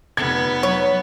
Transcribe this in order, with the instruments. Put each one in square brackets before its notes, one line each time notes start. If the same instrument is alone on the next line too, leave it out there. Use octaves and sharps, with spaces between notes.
[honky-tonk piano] F1 G#6 [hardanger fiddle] B3
[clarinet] F#3 [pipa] C#5